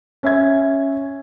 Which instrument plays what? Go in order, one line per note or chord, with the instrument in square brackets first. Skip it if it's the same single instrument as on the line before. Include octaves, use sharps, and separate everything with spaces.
[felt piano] C#4 E5 G#6